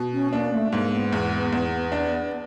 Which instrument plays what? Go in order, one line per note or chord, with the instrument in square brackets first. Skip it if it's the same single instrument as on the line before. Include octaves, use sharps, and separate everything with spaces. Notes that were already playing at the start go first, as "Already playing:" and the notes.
Already playing: [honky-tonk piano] B2
[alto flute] C#4
[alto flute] A#3 [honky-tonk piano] D4
[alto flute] A3
[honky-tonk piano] G#2 [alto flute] A#3
[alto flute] B3
[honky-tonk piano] E2
E2
D4